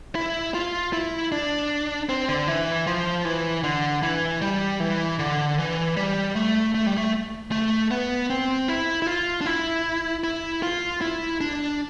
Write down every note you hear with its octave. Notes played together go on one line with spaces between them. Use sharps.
E4
F4
E4
D4
C4
D3
E3
F3
E3
D3
E3
G3
E3
D3
E3
G3
A3
A3
G3
A3
A3
B3
C4
E4
E4
F4
D4
E4
E4
F4
E4
D4